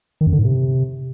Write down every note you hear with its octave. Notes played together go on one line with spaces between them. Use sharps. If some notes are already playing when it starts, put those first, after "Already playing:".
D#3
F#2
D3
G#2
C3